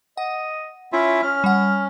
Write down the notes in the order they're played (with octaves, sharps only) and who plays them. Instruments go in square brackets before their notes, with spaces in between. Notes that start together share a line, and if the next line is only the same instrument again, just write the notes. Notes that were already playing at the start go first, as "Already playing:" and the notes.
[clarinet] D#5 [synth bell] F#5
[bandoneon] C#4 E4 E5 [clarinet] F4
[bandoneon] C#4 [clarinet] F6
[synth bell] G3 F#5